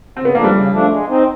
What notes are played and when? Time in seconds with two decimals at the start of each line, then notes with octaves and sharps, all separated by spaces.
0.17 C#3 C4
0.25 B3
0.35 F3 A3 A#3 D4
0.44 G3
0.54 C#3
0.72 F3 A3 D4
0.90 G#3
1.09 C4 D#4